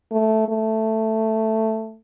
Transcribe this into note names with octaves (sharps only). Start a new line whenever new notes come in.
A3
A3